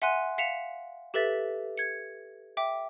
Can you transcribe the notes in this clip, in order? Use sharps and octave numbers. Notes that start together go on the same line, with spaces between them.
E5 F#5 G#5 C6 F#6 D#7
F5 B6 C#7 E7 F7
G4 A4 B4 E5 A6 B6
G#6 C#7
E5 G5 D6